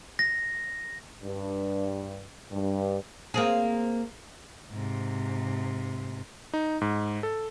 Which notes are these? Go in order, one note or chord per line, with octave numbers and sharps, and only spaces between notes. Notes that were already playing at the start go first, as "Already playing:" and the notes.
A#6
G2
G2
A#3 C4 G#4
G#2 C3
D#4
G#2
A4